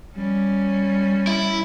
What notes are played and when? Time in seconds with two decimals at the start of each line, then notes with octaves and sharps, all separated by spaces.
0.16 G3 C#4
1.27 E4